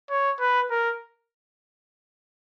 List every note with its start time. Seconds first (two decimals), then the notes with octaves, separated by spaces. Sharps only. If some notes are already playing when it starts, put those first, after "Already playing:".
0.10 C#5
0.40 B4
0.71 A#4